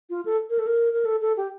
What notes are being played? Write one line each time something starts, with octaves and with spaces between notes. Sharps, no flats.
F4
A4
A#4
A4
A#4
A#4
A4
A4
G4